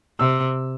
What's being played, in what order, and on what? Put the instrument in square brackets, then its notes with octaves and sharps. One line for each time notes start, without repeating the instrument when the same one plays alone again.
[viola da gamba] C3 [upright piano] E6